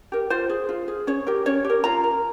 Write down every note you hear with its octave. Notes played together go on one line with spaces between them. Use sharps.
G4 A#4
F4 C5
G#4
F4
G#4
C#4 C#5
G4 A#4
C#4 C#5
G4
A#4
F4 A#5
A#4